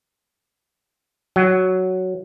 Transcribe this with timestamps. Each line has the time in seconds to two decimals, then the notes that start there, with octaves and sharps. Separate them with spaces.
1.36 F#3